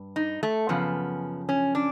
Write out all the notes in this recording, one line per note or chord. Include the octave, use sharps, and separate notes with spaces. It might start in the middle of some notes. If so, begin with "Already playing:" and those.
Already playing: G2
D#4
A3
F#2 C#3 F3 B3
C#4
D4